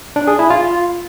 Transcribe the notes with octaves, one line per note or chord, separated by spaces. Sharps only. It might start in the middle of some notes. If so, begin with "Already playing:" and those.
D4
G#4
E4
F4